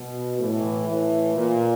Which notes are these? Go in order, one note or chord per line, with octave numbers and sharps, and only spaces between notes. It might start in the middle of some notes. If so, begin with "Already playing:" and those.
Already playing: B2
A2 E3
A2 E3
A#2